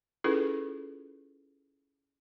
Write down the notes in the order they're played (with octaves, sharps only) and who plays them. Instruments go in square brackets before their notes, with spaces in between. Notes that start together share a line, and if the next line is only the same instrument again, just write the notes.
[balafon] C#4 E4 F4 G#4 A4 B4